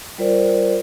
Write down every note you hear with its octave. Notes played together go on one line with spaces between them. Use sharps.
G3 F4 A#4 C5 D5